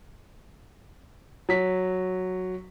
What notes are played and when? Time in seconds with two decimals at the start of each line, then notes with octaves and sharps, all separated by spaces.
1.49 F#3 B6